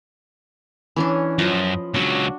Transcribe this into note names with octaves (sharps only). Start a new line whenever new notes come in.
E3 C#4 D4
F#2 F3 D#5 B5
C#2 F#3 D4 F#4